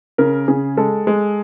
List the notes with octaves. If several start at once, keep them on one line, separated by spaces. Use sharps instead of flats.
C#3 A#4
C#3 G#4
G#3 A4
G#3